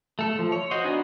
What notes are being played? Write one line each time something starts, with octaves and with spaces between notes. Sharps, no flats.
A3 A4
F3
C#5
F#4 C5 D#5
B3 D4 D#4 F#4 G#5